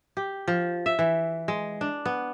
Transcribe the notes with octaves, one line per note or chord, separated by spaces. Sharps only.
G4
F3
E5
E3
G#3
D4
B3